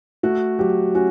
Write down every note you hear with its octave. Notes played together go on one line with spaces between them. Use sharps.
A3 F#4
F#3 G4
C#4 F#4